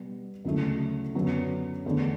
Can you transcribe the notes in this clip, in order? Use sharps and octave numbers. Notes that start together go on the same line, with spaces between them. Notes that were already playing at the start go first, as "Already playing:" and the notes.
Already playing: B2 G3 B3
D2 C#3 F#3 A3 E4
F#2 D3 F#3 B3
E2 D3 A3 D4